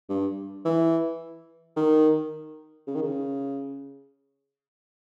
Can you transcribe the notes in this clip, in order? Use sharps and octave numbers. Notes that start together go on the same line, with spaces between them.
G2
E3
D#3
C#3
D#3
C#3